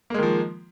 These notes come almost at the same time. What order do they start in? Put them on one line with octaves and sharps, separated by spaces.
A#3 G#3 D#3 F3